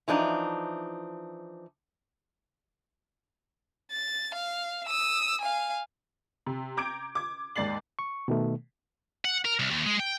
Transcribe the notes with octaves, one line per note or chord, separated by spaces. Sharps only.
E3 F3 D4 D#4
A6
F5
D#6 E6
F5 G#5
C3
A#5 D6 G6 G#6 D7
D6 G#6
D#2 G#2 D5 A6 C7 F#7
C#6
B2 D#3 A3
F#5
A#4
C2
D#2
G#3
G5